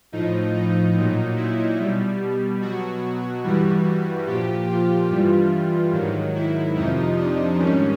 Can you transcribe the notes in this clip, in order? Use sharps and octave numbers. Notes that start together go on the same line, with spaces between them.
A2 F3 D#4
D#4
A#2 F#3
E4
B2 G3
B2 F#3 F#4
G2 E3 G3 F#4
A#2 F3 G4
F4
G2 E3 G3
G#2 D#3 F#3
E4
F2 C3 F3 D#4
D4
G#2 D#3 G3 C#4